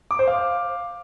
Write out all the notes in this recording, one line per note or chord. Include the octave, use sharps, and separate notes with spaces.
D6
C5
F5